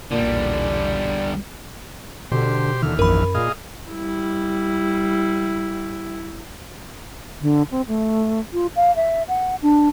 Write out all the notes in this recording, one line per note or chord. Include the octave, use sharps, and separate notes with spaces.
B1 E2 A#2 D3 G3 D5
B2 D3 G4 C5
D#2 D3 E3 F6
A#1 F#2 A#4 B5
A#2 G#4 D#5 F5
G3 E4
D3
C4
A3
F4
F5
E5
F#5
D4